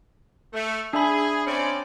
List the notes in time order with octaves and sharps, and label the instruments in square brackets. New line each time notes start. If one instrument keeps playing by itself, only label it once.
[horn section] A3
[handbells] D4 E5 B5 [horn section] G#4
[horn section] C4 C#4 D5